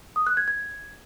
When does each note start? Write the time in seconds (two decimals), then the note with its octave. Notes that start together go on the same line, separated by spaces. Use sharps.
0.16 D#6
0.27 F#6
0.37 G#6
0.48 G#6